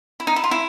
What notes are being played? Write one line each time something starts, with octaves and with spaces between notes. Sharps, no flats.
E4
D#4
E4
F4
E4